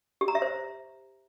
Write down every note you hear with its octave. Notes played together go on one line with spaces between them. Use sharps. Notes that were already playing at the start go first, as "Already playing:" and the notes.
G4
A#5
E5
C5